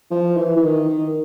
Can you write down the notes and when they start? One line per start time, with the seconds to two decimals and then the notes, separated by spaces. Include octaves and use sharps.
0.11 F3
0.37 E3
0.57 E3
0.63 D#3
0.88 D#3